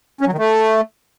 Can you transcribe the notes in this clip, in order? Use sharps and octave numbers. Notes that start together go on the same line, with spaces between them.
C#4
F#3
D#3
A3